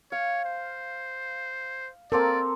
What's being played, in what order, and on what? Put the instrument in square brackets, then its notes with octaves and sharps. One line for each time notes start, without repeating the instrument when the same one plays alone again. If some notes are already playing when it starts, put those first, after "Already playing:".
[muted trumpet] C#5 [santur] F5
[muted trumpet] C5
[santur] A#3 C4 A4 [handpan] A#4 [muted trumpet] D5